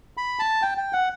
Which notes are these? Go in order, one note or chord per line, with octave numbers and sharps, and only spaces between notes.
B5
A5
G5
G5
F#5